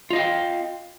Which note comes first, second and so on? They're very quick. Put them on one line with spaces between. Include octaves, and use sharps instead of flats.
F4 D#5 F5 G5